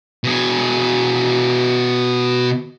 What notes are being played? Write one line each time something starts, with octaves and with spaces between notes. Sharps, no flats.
B2 G#4